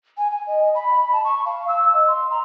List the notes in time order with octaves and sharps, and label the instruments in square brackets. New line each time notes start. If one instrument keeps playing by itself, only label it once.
[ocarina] G#5
G#5
D#5
B5
A5
C#6
F5
E6
D#5
C6
A#5